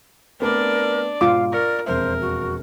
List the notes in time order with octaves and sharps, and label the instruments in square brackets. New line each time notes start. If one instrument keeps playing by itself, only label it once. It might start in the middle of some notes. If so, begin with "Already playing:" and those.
[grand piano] A3 B3 C4 [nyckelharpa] D4 D5 [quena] A#4
[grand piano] G#2 B2 [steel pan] F4 D6 [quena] F5
[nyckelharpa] A#4 [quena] D5 [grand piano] C#6 A#6 C#7
[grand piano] E1 F2 E5 [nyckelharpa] A#4 [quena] C5
[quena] F#4